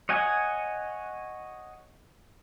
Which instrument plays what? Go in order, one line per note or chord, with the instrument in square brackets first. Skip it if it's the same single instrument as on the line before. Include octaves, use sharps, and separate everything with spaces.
[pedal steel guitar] C#5 D#5 F#5 G#5